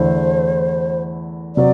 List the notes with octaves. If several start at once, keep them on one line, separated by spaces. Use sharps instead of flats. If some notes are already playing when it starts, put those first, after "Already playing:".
Already playing: E2 D3 A3 E4 C5
C3 F#3 D5